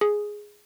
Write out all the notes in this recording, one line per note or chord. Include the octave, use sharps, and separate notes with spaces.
G#4